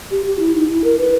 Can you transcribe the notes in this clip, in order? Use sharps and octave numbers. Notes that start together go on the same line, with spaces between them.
G4
G4
E4
D#4
E4
A#4
B4